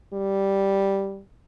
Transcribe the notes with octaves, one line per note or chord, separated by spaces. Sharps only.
G3